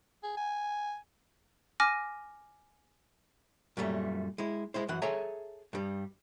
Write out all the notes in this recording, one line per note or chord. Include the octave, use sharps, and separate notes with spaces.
G#4
G#5
G#5 D6 F6 A#6 D#7
F#2 A#2 G3 A3
G#3 E4
G#3 E4 C5
F#2 E3 F#5
G#4 A4 C#5 E5 G#5 A#5
G2 G3